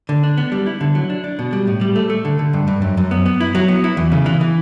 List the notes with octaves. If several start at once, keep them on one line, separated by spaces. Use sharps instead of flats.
D3
D4
B3
G3
E4
D3
F#3
D4
D4
B2
G3
A2
G3
A3
A3
D3
D3
G2
G2
F#2
F#2
B3
B3
E4
F#3
B3
E4
E2
C#3
E3
E3